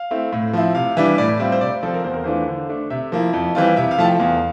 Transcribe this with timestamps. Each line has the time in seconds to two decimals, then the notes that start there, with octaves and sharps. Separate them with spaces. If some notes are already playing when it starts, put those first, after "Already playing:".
Already playing: F5
0.11 A3 C4 E4
0.33 A2
0.53 F3 C4 E4
0.75 C3 F5
0.97 E3 G3 D4 E5
1.18 A2 D5
1.39 G3 C4 F4 E5
1.52 C5
1.61 C3 D5
1.83 F3 C4 F4 A4
1.94 A#4
2.04 E2 C5
2.14 A#4
2.24 E3 A3 D4 F4 C5
2.47 D3
2.69 A3 D4
2.90 C3 E5
3.12 F3 A#3 E4
3.33 F2
3.55 E3 G3 C4 F4
3.76 C3 E5
3.91 F5
3.98 F3 A3 E4 A5
4.05 G5
4.20 E2 F5